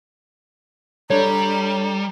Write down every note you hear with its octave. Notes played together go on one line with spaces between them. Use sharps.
G3 D4 A4 C#5 A#5